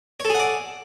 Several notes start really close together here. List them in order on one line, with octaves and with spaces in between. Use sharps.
C#5 A4 G#4 F#5 D5